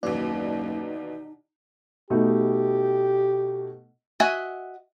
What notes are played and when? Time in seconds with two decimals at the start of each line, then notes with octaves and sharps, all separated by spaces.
0.03 F#1 D#2 B2 E3 D#4 D5
2.10 B2 A3 D#4 G4
4.20 F#4 D#5 E5 F#5 G#5